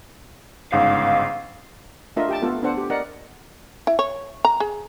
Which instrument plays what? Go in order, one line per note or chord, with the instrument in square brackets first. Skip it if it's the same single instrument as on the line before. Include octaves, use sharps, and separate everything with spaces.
[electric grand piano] G1 G#2 C#3 [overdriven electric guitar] F5
[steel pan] A3 D4 F4 A#4 D#5 E5
G4 G5 A5
A3 B3 F4 A4
B3 D4 A4 C5 F#5
G4
A#4 D5 D#5 F#5
[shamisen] E4
C#5
A#5
G#4